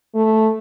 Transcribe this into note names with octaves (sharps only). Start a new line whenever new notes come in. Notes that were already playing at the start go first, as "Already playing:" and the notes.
A3